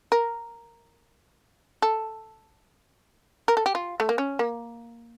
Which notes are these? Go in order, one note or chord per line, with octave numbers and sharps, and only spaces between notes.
A#4
A4
A#4
A4
G4
F4
A3
A#3
C#4
A#3